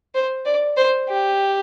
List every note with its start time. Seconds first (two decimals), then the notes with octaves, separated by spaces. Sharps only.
0.15 C5
0.46 D5
0.77 C5
1.09 G4